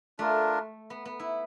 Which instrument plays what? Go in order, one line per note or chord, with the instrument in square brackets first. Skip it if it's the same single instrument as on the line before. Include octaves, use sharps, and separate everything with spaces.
[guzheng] A3 [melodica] D4 F4 A#4
[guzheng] B3
B3
E4